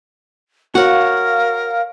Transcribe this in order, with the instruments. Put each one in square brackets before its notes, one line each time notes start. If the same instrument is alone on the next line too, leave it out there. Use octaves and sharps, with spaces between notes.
[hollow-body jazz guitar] F#4 [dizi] A#4 [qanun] C#5 F#5 [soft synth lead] F5